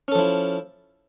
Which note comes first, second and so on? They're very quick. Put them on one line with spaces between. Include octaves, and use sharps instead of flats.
C#4 A4 F3 E4